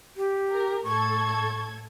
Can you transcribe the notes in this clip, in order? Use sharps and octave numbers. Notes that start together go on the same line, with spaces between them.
G4
A#4
A2 A4 C#6 G#6